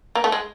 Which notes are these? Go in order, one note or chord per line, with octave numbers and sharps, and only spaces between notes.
A#3
A3
G#3